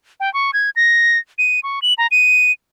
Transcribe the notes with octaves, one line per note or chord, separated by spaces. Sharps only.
G5
C#6
G#6
A#6
D#7
C#6
F#7
A#5
D#7